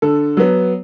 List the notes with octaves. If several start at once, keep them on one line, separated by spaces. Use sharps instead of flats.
D3 A4
F#3 B3